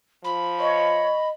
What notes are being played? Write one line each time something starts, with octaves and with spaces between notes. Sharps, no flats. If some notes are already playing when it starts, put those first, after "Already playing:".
F3 B5
C#5 D#5